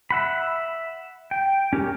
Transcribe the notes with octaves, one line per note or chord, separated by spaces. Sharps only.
E5 F#5 B5
G5
C#4 G4 A#4